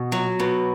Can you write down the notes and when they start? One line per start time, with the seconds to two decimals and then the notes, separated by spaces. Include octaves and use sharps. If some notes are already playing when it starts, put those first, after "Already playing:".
Already playing: B2
0.12 F#3
0.40 B2